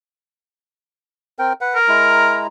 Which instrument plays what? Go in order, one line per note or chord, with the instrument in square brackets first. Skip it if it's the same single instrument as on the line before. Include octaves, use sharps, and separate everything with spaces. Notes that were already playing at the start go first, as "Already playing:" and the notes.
[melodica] C4 A#4 G5
B4 F#5
[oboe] A#4
[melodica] G#3 E4 A#5